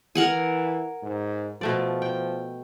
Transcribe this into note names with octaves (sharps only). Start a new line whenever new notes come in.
E3 A#4 F#5 G#5
G#2
B2 F3 A3 D5
G5